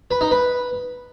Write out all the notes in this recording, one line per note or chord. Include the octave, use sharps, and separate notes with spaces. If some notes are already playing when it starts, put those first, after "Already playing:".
B4
D#4
B4